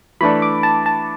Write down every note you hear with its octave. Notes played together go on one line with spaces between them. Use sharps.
E3 A3 D4 A4 B5
D6
A5
A5